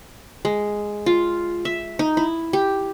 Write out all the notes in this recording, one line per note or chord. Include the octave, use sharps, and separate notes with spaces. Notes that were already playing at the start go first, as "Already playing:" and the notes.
G#3
F4
E5
D#4
E4
G4